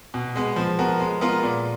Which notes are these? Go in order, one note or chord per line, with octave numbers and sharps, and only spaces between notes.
B2
G#3 B3
F3
B3 F#4 A#4
G#3
B3 F4 A#4
A#2